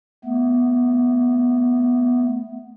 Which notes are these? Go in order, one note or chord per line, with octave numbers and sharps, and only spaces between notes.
A3 B3